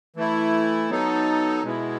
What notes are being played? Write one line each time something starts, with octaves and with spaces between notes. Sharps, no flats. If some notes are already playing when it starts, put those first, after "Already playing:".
E3 A3 E4
F#3 B3 D#4 A4
B2 G#3 B3 E4